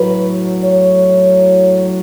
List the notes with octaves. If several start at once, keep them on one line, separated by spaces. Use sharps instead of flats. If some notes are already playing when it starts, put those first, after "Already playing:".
Already playing: A2 F#3 B4
C#5